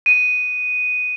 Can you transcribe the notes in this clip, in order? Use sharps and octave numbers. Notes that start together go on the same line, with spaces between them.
D#7